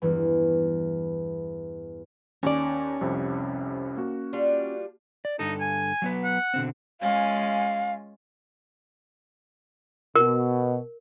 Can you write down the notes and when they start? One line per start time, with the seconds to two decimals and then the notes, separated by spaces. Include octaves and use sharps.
0.02 E2 G2 E3
2.43 D#2 C#4 D5
3.01 C2 F2 C3
3.97 A#3 F#4
4.33 G3 D4 F4
5.25 D5
5.39 G2 D3 D#4 A4
5.60 G#5
6.02 F#3 B3 B4
6.24 F#5
6.54 B2 D3 C4
7.01 G#3 C#4 F4 F5
10.15 B2 A#4